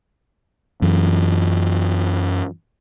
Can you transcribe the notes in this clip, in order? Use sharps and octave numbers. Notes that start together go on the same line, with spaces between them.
F#2 E3